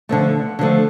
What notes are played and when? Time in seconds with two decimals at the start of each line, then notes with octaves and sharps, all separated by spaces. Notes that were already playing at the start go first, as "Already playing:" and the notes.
0.09 D3 F3 A3
0.59 D3 F3 A3